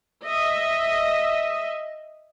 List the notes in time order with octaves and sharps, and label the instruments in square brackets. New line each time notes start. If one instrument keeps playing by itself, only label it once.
[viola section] D#5 E5